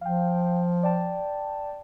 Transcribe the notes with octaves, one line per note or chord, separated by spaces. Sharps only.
F3 F5 G5
D5 G5 A5